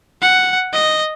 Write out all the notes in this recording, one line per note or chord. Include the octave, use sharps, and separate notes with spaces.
F#5
D#5